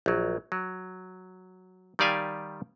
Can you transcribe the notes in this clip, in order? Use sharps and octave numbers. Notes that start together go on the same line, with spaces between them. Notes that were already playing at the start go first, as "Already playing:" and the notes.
A#1 F#3
F#3
D#3 G3 G4 D5 F5 G#5